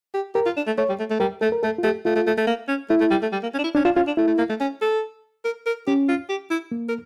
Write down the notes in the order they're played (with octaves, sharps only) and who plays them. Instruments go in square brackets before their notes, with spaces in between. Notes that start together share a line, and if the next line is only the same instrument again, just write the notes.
[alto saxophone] G4
[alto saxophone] G4 [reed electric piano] A#4
[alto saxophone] F4
D4
A3
[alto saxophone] A3 [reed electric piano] C#5
[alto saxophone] G3
A3
A3
[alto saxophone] G3 [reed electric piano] A#4
[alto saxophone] A3 [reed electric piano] A4
[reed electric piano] A#4
[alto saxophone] A3 [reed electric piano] A4
[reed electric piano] F4
[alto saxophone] A3 [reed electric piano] G4
[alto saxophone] A3 [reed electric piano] F4
[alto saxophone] A3
A3
A3
A#3
C#4
[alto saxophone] A3 [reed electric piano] E4
[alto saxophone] A3
G3
A3
G3
A#3
C#4
D4
E4
[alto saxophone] C#4 [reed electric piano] D4
[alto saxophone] D4 [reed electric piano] F4
[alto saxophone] C#4 [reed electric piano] F4
[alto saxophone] D4
[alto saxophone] A3 [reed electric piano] E4
[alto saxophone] A3
A#3
A3
C#4
A4
A#4
A#4
[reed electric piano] C#4 [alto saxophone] G4
[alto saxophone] F4
G4
E4
[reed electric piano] A#3
[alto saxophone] A#4